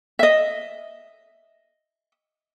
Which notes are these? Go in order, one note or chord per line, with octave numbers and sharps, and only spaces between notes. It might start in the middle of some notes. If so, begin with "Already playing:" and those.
D#5 E5